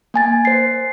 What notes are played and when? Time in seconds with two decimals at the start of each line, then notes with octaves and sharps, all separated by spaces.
0.14 A#3 G#5 A6
0.45 C5 C7